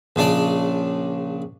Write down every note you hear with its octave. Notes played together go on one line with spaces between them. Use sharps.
A#1 C#3 D4 D5